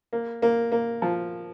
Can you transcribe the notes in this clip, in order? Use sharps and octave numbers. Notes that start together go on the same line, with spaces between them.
A#3
A#3
A#3
F3